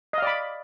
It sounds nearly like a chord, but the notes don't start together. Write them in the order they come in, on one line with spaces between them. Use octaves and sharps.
D#5 F5 D5 B5